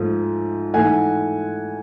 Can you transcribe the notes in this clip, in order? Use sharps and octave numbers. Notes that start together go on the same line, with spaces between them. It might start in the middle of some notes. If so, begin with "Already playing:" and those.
Already playing: G#2 F3 A3
G#2 E3 A3 F#5 G#5